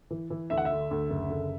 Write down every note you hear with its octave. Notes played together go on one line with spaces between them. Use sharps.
E3
E3
D2 E5
F#5
E5
D3
D2
F#1
D3